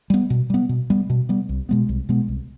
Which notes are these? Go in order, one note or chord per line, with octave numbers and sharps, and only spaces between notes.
G3 B3
B2
G3 B3
B2
G3 B3
B2
G3 B3
C2
B2 G#3 B3
C2
B2 G#3 B3
C2